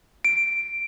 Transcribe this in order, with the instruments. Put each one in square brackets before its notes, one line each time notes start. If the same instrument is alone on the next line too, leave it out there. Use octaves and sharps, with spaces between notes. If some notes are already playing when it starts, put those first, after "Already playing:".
[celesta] D7